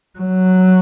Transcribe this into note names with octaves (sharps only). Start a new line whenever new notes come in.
F#3